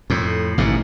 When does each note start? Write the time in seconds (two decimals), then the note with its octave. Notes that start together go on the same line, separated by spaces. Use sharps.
0.10 F2 A2
0.58 A1 G#2 B2